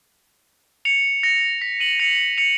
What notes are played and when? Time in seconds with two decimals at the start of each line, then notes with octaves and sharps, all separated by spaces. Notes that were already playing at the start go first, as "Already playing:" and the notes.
0.85 C#7 F7
1.23 A#6 C#7
1.61 B6
1.80 D#7 F#7
1.99 C#7 F7
2.38 C#7 F7